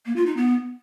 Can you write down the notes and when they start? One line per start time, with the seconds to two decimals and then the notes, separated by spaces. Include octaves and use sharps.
0.06 A#3
0.16 F4
0.26 D#4
0.37 B3